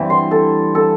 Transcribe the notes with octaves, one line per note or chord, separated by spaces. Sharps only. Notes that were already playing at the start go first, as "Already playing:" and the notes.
Already playing: G2 E3 C4
C6
A4
A4